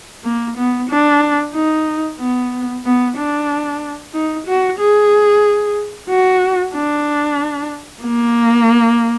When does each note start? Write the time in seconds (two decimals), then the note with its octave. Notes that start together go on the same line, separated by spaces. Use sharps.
0.24 A#3
0.58 B3
0.89 D4
1.55 D#4
2.19 B3
2.85 B3
3.17 D4
4.14 D#4
4.47 F#4
4.79 G#4
6.10 F#4
6.75 D4
8.04 A#3